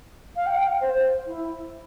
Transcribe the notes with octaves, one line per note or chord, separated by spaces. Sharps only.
F5
G5
F5
C5
E4